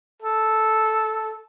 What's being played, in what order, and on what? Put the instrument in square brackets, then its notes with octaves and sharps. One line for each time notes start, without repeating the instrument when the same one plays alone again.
[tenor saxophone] A4